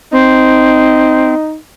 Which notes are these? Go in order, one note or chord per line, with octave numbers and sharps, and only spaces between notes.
C4 D#4